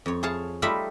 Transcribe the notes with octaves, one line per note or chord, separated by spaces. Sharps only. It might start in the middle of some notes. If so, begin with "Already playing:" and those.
F2 C#5
G#4 C#5 F5 A5
G3 A3 D#4 F4 E5 B5